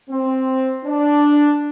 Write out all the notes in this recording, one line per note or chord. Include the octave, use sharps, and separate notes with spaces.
C4
D4